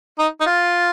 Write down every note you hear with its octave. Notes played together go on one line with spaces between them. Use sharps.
D#4
D#4
F4